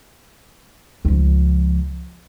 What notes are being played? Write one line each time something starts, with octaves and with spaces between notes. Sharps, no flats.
C#2 F3